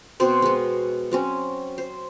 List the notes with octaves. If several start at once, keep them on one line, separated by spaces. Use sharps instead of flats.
B2 C4 C5
G#3 B3
F#3 C4 C#4
C5